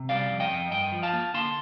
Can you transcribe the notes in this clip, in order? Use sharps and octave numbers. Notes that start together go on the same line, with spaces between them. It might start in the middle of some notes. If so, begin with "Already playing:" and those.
Already playing: C3
G3 D5 F5
F2
D#5 G5
F2
G2 D#5 G5
F3
F5 A5
A#3
D3 A5 C6